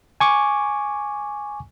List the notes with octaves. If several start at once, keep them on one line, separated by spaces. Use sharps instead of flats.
G#5 C#6 D6